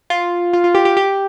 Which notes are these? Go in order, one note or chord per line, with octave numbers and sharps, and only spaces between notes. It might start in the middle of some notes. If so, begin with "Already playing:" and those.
F4
F4
F4
G4
G4
G4